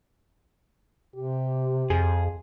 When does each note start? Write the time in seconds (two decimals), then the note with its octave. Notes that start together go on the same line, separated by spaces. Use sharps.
1.15 C3 G4
1.90 F2 G#4